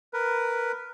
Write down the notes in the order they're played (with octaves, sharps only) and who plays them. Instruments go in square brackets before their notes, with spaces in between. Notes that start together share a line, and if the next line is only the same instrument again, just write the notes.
[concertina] A#4 B4